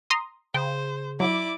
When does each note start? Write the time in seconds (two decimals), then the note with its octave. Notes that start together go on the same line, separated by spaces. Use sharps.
0.10 A#5 C6 D#6
0.54 C#3 C5 G5
1.20 F#3 E4 D5 D6